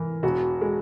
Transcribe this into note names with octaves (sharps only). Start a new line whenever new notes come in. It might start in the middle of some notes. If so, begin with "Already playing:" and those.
Already playing: E3 A#4
E1 F#4
G#3